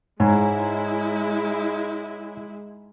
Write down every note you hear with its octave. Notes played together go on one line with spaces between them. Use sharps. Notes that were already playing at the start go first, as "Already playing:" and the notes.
G#2 G#3 E4 C#5 G#5 A#5